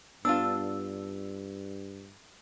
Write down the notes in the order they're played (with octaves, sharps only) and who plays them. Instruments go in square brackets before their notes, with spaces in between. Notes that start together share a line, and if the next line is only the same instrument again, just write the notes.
[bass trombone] G2 [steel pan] B3 A5 [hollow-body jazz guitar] D4 F4 [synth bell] E6